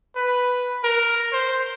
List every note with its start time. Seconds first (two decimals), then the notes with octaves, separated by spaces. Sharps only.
0.16 B4
0.84 A#4
1.33 C5